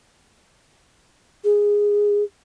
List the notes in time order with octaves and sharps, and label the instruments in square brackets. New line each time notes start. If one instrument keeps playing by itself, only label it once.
[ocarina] G#4